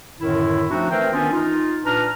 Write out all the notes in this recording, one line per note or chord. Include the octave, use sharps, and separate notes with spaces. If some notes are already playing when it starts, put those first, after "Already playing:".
F#2 A2 D3 D#3 E4
F3 A3 C4 D4 D#4 F#4
E3 A3 C4 A#4 C5 G5
D#3 E3 B3 C#4 D4 F4
D#4 F4
A#2 D4 B4 A#5 F6